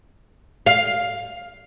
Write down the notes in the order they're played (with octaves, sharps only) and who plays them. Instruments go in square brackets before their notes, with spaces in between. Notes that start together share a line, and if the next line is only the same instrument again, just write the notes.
[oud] F5